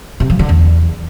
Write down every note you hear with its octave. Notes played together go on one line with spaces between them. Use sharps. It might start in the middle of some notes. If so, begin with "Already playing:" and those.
C3
F3
D3
E2